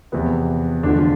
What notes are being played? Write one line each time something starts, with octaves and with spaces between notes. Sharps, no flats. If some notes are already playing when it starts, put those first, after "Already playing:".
E2 C3 F3 B3
F1 E2 D3 F3 D4
F4